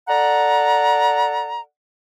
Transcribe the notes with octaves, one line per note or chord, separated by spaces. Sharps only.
A4 D5 F#5 A#5